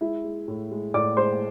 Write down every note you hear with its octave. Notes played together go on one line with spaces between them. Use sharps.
G#3 E4 E5
G#3
A2
G#3
A2 D5 D6
G#3 C5 C6